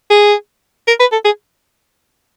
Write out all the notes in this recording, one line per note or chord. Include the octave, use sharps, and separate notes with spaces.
G#4
A#4
B4
A4
G#4